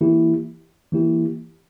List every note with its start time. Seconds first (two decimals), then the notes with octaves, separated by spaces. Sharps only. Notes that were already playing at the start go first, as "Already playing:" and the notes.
0.01 E3 A#3 E4 G4
0.92 E3 A#3 E4 G4